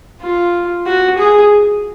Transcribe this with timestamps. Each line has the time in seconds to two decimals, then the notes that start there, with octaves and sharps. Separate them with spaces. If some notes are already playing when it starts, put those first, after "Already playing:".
0.22 F4
0.86 F#4
1.18 G#4